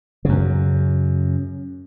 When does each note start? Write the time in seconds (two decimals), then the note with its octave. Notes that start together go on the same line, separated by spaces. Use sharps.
0.25 F#2 C#3